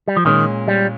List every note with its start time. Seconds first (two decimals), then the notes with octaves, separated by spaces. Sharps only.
0.08 G3
0.17 F3
0.25 A#2 D#3 G#3 C#4
0.68 G3